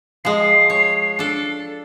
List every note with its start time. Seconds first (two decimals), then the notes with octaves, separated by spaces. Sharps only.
0.25 F3 G#3 C7
0.70 C#5
1.19 D4 A4